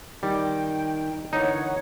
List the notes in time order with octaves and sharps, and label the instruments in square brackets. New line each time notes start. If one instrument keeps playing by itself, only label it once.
[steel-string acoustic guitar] D#3 D#4 [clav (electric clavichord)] G3 [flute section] G5
[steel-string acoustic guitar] D3 E3 A#3 [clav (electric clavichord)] D#4 [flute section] C#5 F#5